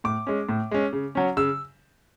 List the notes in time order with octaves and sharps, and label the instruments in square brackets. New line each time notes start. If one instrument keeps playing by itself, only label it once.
[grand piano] A2 D6
G#3 C#4
A2
G#3 C#4
C#3
F#3 C#4
C#3 E6